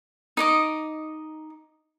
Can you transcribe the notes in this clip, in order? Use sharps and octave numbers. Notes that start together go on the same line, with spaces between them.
D#4 D#5 D6